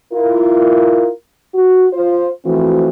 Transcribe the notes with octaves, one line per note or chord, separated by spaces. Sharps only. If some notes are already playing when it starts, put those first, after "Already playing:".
E4 F4 A#4
F#4
F4 C5
E3 F3 A3 C4 F#4